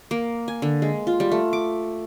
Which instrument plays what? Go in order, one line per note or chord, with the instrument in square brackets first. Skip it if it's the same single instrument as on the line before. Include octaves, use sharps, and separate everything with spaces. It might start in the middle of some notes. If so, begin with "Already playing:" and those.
[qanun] A#3
G#5
D3
G#3
F4
G3
A3
D6